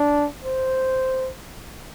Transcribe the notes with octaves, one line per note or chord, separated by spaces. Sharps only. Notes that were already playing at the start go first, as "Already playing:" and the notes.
Already playing: D4
C5